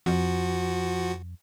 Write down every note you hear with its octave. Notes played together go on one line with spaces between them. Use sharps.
F2 F3 F#4